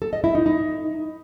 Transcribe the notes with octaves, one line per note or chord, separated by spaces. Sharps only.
A4
D#5
E4
D#4
D#4